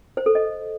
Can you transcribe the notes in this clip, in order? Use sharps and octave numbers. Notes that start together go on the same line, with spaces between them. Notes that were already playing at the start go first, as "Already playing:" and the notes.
C5
A4
D#5